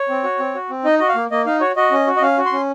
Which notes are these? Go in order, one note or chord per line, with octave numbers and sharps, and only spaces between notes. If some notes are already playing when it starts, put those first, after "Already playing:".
Already playing: C#5
C4
F#4
C4
F#4
C4
D#4 D#5
F#4 D#5
F5
A#3
A#3 D#5
D#4 F5
F#4 C#5
F#4 D#5
C#4
F#4
D#5
C#4 F5
F#4
C6
C#4